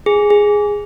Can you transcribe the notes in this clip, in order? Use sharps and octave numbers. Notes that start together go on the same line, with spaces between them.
G#4
G#4